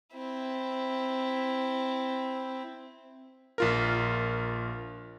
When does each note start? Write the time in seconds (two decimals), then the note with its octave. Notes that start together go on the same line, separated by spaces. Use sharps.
0.14 C4 E4
3.58 A#1 F4 A#4